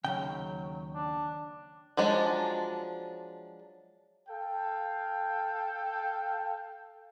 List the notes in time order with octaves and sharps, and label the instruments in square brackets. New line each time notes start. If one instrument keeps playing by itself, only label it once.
[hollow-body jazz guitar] D#2 C#3 [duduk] F#3 [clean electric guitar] G5
[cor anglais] D4
[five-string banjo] F3 F#3 G#3 D4
[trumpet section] A4 F5 G5